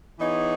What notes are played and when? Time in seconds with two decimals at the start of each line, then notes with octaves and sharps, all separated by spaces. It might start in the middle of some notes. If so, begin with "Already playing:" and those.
0.20 E3 B3 D#4 G#4 C#5